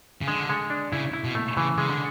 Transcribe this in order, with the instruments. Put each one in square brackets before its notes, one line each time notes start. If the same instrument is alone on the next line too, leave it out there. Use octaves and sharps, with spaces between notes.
[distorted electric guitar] C#3
[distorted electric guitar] D3 [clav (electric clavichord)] G#3
[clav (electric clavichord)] G#3
D4
[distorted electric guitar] C#3 [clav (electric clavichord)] E4
[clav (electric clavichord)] E4
[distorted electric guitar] B2
[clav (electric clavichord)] A3
[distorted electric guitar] C#3 [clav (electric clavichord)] E3
[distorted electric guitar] C#3 [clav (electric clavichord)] G#3
[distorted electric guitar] D3